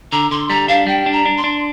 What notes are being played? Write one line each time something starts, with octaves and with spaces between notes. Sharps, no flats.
D3 A#5
D3 C6
G3 A#5
D4 F5
G3 G5
D4
A#5
D4
C6
D4